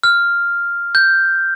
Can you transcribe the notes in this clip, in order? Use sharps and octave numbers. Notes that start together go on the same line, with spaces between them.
F6
G6